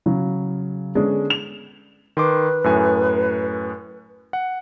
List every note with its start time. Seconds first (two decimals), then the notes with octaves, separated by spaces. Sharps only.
0.06 C#3 F#3
0.95 D3 G#3 B3 C#4 D4
1.30 F7
2.17 D#3 B4 C6 D6
2.64 F#2 A2 G#5
4.33 F#5